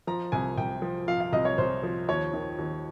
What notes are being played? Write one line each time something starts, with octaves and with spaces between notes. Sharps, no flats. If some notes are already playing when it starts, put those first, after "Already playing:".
F3 A#5
C2 G#5
C2 G5
F3
F3 F5
F5
C2 D#5
C#5
C2 C5
F3
D#2 C#5
D#3
D#2